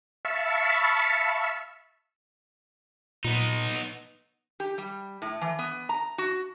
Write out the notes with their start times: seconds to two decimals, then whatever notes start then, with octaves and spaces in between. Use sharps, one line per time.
0.25 E5 F5 A5 B5 C#6
3.25 A#2 B3 D#4
4.60 G4
4.78 G3
5.22 A2
5.41 E3
5.59 B3
5.89 A#5
6.18 F#4